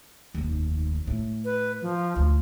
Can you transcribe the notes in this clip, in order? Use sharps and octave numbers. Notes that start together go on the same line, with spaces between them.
F1 D#2
A2
B4
F3
D2 F4